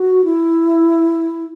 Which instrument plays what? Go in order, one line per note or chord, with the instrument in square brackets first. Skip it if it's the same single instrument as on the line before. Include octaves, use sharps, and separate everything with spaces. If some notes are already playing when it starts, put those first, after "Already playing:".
Already playing: [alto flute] F#4
E4